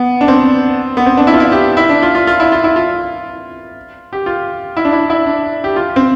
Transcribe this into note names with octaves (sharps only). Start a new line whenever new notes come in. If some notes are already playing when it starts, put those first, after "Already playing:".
Already playing: B3
D4
C4
B3
C4
D4
E4
F4
E4
G4
E4
D4
F4
F4
F4
E4
F4
E4
F4
G4
F4
E4
D4
E4
E4
D4
G4
F4
C4